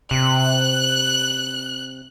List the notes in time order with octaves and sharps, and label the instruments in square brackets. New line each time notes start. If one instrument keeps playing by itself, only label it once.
[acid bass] C3 [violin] F#6